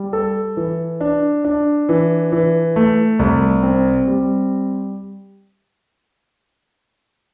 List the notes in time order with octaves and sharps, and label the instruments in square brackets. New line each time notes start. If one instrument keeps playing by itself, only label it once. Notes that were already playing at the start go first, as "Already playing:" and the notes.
Already playing: [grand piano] G3
A4
E3
D4
D4
E3
E3
A3
C2
C4
G3